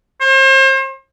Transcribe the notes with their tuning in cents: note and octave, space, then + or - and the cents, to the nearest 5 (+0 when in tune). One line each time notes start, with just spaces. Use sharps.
C5 +40